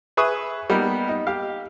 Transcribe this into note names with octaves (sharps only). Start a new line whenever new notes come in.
G#4 B4 E5 C#6 D#6
G3 A#3 B3 D#4 A#4
D#4
G4 F5